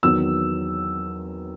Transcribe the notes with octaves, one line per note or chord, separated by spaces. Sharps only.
E2 D#3 F#3 E6